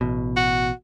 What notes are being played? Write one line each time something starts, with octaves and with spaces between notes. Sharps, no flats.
A1 B2
F#4